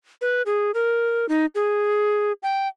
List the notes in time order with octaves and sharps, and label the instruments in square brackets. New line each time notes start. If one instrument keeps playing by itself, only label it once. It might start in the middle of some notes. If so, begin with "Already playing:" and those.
[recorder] B4
G#4
A#4
D#4
G#4
G5